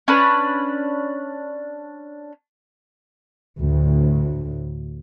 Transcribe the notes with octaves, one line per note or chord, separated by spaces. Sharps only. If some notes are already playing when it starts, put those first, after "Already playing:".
C#4 D4 B4
D2 A2